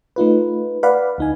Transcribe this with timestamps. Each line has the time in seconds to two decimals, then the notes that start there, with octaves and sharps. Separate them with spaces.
0.16 A3 D#4 F4 B4
0.83 B4 D5 F5 F#5 B5
1.18 D2 D#4 G#5